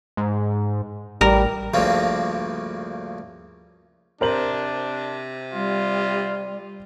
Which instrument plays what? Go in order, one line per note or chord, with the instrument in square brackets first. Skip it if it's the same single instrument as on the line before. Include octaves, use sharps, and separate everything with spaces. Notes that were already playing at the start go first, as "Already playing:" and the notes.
[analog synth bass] G#2
[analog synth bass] A1 [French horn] G3 [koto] A#4
[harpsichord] D2 G2 C#3 F3 A#3 C4
[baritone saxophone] C3 [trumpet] D4 [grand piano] A#4 C5 F#7
[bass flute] G3 [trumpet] F4